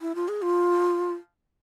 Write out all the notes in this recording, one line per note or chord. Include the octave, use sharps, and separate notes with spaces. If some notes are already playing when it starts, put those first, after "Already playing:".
E4
F4
G#4
F4